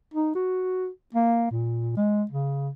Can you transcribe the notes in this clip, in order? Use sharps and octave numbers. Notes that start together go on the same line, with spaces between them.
D#4
F#4
A#3
A#2
G#3
C#3